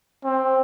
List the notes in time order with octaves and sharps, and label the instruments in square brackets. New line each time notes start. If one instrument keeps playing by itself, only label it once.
[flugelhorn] C4